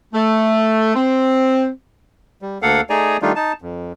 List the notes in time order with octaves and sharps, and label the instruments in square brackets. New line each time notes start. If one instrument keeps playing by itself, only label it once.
[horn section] A3
C4
[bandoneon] G3
D2 A#3 A4 F5 F#5
A3 D#4 G#4 D5 G#5 A#5
D#3 G3 A3 D4 D#4 F4
D#4 A5
F2